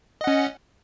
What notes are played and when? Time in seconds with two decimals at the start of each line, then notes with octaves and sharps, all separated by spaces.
0.21 D#5
0.24 F#5
0.27 C#4